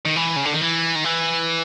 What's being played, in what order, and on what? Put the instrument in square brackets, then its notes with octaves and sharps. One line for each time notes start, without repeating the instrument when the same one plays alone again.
[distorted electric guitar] D#3
E3
C#3
D3
D#3
E3
D#3
E3